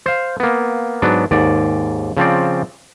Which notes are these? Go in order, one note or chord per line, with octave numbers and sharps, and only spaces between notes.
C5 F5
A#3 B3
G#2 F#3 B3 D4
D#2 G#2 D5
C#3 F3 C4 D5